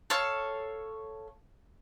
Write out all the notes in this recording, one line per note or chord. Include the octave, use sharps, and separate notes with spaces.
A4 C#5 F5